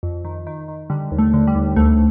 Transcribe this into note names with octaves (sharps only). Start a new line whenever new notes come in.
F2
D#3
D#3
D#3
D3 G3
D#2
A3
D3
G3
D#2
D2 A3